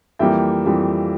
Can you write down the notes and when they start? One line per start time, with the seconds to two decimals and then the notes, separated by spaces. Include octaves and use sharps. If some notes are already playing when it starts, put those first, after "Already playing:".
0.19 F2 E3 G3 A#3 E5 G5
0.65 F2 E3 G3 A#3